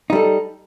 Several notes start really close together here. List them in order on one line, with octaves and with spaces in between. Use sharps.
D#4 G3 A4